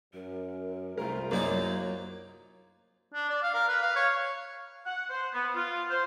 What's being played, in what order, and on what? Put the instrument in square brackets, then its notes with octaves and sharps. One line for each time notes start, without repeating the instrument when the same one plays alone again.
[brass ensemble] F#2 [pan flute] A#4
[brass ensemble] C2 C5 [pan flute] A3 [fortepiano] F4 A#4
[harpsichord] F#2 D#4 F4 [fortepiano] F#3 A#3 D5 [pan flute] C#5
[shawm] D4
D5
F5
A#4
B4
F5
C#5
[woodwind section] F#5
C5
B3
F4
C5